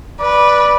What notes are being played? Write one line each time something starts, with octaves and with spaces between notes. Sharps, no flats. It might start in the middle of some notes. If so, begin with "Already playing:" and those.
B4 D5